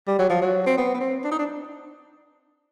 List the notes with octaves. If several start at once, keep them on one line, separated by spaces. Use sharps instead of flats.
G3
F#3
F3
F#3
C4
B3
B3
C4
D4
D#4
D4